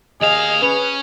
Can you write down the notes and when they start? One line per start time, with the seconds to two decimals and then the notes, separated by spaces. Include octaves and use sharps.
0.21 D#2 G#4 D#5 F5
0.62 C#4 B4